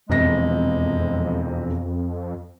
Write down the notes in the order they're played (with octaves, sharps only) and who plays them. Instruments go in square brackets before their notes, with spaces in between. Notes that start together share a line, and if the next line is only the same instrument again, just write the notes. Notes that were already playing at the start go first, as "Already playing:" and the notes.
[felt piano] E1 C3 A#6 [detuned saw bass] F2 [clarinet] G#3